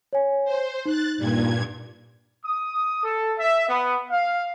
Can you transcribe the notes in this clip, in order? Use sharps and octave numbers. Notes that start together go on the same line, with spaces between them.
C#5 G#5
C5
D#4 F#6 A6
G2 A#2 G#6
D#6
A4
E5
B3
F5